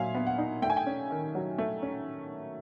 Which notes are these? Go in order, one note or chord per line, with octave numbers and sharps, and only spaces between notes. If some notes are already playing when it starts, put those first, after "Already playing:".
Already playing: A#2 F#3 E5 F5 G#5
B3
F#5
D#4
A3 G5
G#5
G5
C#4
D#3
F#3
A3
C#4